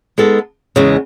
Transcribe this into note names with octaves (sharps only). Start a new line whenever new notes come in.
G#3 B3 D#4 A4
E2 C#3 G#3